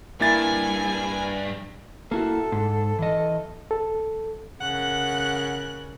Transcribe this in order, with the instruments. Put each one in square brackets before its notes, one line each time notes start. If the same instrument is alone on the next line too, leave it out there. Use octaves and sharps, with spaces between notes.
[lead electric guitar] G2 [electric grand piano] A#3 E4 A6 [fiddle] G#5
[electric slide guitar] A#3 E4 F#4 [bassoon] A4
[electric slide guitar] G#2
E3 D#5
[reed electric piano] A4
[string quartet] C#3 A#4 [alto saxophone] F#5 [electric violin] F#6